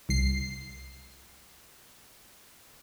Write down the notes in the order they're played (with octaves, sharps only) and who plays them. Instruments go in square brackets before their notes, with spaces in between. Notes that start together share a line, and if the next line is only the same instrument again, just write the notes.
[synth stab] C2 C7